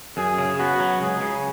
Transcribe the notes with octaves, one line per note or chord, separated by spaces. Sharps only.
F#2 G#4
C#3
B3 F#4
F#3
C#2 G#4
C#3